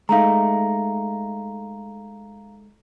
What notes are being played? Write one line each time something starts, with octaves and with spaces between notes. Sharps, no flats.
G#3 A3 D#4 F5 A#5